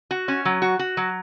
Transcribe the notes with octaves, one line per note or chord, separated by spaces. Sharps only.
F#4
C#4
F#3
F#4
F#4
F#3